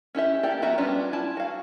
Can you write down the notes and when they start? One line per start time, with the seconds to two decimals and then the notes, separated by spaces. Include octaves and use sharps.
0.15 C#4 E4 G4 E5
0.43 A#3 G4 A4 D5 G5
0.62 F3 B3 F#4 E5 A#5
0.78 G3 B3 C#4 D4 F4
1.13 E4 G#5 A5
1.37 F#4 F5